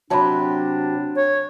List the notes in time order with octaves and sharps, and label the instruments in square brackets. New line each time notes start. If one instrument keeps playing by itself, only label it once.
[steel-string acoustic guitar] C3 F#3 G4 [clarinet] D4 [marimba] A5 B5
[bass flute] C#5